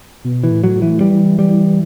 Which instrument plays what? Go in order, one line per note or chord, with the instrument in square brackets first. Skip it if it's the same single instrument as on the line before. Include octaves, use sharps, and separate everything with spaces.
[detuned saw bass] B2
[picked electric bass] E3
[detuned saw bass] A2
[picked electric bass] F#3
[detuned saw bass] A2
[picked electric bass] E3
[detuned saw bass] E3 [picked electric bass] G3
[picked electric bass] G3